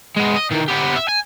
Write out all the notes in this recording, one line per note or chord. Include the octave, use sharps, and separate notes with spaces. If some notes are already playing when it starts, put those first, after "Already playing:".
G#3 B3
D#5
D#3 E3
B3 G4
E5
G#5